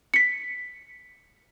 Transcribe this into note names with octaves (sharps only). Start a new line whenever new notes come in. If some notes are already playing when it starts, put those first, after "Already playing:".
B6 C#7